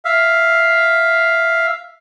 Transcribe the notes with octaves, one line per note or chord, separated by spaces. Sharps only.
E5 F5